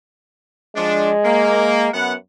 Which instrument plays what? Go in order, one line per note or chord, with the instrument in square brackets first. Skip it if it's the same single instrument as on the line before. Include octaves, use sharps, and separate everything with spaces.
[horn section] F3 D4 [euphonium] G#3
[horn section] A#3
[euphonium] F#2 [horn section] B3 F#5